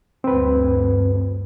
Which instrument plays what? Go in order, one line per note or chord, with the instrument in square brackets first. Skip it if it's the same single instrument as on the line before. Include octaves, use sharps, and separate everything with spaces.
[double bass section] D2 G2 [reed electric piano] C4 B4